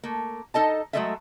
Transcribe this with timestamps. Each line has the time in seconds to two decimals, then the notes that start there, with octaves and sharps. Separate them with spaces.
0.03 A3 A#3
0.54 D#4 A4 D#5 A5
0.93 F#3 G#3 A3 A4 D#5 E5